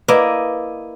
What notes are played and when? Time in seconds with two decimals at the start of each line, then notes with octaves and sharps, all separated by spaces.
0.08 A#3 E4 B4 D5 D#5